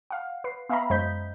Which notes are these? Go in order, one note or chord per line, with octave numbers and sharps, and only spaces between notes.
F5 F#5
B4 C7
B3 E5 F5 G5 A#5 B5
F#2 G#3 C5 D#5 G6 B6